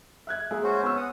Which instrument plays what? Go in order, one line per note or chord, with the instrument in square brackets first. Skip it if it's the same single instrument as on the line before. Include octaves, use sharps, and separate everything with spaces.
[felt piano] E5 F#6 G#6
G#3 A#3 E5
[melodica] C#4 F#4 C5
[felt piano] B3 E6 [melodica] C#4
[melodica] F#5 D#6